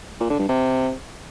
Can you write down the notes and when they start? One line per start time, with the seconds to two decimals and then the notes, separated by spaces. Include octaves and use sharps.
0.21 A#2
0.30 D3
0.39 G2
0.49 C3